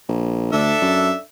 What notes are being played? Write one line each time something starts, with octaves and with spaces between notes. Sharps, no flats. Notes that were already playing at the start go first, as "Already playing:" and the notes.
A#1
D2 D4 A4 E5
F#2